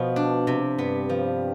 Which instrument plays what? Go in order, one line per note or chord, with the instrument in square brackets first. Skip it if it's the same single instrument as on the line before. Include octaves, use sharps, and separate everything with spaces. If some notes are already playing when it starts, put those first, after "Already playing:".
Already playing: [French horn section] B2 [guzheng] F3 B3
[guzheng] D4
C3
[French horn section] G2 [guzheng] B3
[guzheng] F3